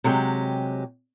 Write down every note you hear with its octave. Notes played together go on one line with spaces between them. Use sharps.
C3 F#3 G#3 G4